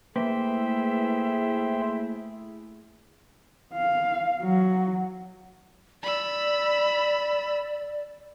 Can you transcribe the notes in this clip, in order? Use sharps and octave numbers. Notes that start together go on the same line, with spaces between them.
A3 A#3 E4 G#4 B4 C5 E5 G5
F5
F#3
D5 B5 E6